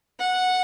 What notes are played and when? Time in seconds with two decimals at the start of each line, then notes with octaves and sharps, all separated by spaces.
0.20 F#5